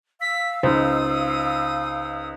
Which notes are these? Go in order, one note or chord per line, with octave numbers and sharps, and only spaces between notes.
F5 E6 B6
C#2 D#4 C5 D#6